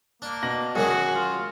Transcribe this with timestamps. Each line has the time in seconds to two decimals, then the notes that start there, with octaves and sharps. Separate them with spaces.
0.22 A#3 D4
0.43 B2 A#6 F#7
0.75 F#2 D#3 F#3 G#3 F#4 G#4
1.15 F4